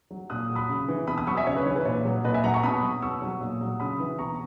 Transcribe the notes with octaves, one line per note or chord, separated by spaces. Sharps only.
F#3
A#2 D#6 F#6
F#3
B5 D#6
C#3
E3
B2 B5 D#6
B5 D#6
F#3 C#6 E6
E5 G#5
C#3 C#5
B4
E3 C#5
B4
A#2 C#5
F#3
A#2 B4 D#5
E5 G#5
F#3 F#5 A#5
A#5 C#6
B2 B5 D#6
F#3
B2 C#6 E6
F#3
A#2
F#3
C#3 B5 D#6
E3
B2 A#5 C#6